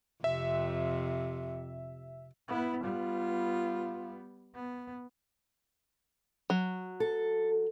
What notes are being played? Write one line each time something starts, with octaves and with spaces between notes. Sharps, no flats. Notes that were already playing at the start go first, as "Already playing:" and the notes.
F2 C3 E5
B3 E4
G3 B3 F4
B3
F#3
A4